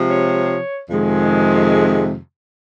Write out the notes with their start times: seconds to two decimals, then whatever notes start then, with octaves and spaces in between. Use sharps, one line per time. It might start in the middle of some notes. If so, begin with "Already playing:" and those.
Already playing: C3 F3 G#3
0.09 C#5
0.88 F2 C3 D#3 G#3